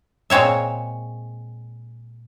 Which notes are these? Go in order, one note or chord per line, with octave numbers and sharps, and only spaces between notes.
A#2 G#3 C4 C#5 E5